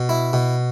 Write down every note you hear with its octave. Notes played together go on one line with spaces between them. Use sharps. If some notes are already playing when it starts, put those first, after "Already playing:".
Already playing: B2
E4
B2